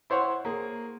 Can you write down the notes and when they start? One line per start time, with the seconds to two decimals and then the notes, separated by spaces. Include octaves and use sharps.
0.10 E4 C5 C#5 F#5
0.45 A#3 G#4